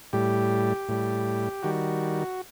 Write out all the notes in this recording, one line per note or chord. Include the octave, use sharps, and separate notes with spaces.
A2 G3 G4
A2 G3
D#3 G3 F#4